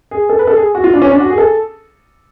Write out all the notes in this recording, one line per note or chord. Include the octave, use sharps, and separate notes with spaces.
G#4
A4
B4
A4
G#4
F#4
F4
D4
C#4
D4
F#4
G#4
A4